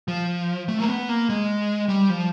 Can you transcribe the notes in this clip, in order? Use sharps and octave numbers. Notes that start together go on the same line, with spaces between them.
F3
A3
A#3
B3
A#3
G#3
G3
F3